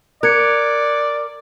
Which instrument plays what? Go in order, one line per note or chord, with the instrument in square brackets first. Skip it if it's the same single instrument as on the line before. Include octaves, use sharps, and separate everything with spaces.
[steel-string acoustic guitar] A#4 [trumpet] D5 [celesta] F#6 G#6 C#7